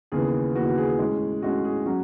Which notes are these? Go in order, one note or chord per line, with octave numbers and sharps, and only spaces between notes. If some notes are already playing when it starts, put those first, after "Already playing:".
D#2 C#3 E3 B3 G#4
D#2 C#3 E3 B3 F#4
F#4
G#4
A2 G#3 C#4
A2 G#3 C#4 F#4
G#4
F#3 C#4 F#4